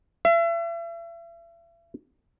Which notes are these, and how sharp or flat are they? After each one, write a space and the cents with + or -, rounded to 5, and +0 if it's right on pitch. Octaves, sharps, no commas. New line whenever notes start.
E5 +40